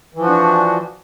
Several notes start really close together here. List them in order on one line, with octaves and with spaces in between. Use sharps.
E3 F3 F#4 D4